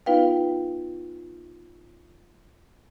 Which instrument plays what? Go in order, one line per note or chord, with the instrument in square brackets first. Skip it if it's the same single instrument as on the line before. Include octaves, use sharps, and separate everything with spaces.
[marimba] B3 D#4 F4 B4 F5 G5